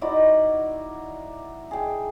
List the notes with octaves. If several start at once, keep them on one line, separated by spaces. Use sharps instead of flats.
D#4 E4 F#4 D5
G#4 G5